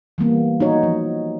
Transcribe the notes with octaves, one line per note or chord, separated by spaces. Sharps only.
E3 G3 A#3 B3
D#4 F#4 C#5
F3